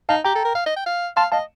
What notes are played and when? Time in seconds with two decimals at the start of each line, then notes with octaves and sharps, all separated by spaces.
0.09 D#4 F5 A5
0.24 G4 G5 A#5
0.35 A4
0.45 A#4
0.55 F5
0.66 D#5
0.76 G5
0.86 F5
1.17 F5 A5 C6
1.32 D#5 F5 A5